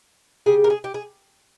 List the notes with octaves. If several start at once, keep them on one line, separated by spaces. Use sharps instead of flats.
C#3 G3 G#4
A#4
G#4
G4
G#4